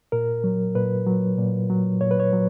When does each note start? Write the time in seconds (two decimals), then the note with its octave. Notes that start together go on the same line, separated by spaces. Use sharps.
0.12 A#2 A#4
0.44 F#3
0.75 A#2 B4
1.06 F#3
1.38 A#2
1.70 F#3
2.01 A#2 C#5
2.11 B4
2.20 C#5
2.33 F#3